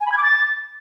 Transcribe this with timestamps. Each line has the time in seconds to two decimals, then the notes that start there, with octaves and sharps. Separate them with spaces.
0.01 G#5
0.06 B5
0.12 G#6
0.17 D6
0.23 A6